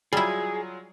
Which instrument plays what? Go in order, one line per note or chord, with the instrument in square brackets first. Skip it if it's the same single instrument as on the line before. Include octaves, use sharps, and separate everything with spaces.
[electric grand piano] F#3 F4 [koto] G3 E4 [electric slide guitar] G#4